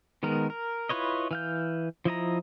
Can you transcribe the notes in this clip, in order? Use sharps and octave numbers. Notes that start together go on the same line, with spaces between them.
D#3 G#3 B3 A#4
A#4
E4 F4 B4 C#5 D#5
E3 F5 G6
F3 E4 D#5 A#5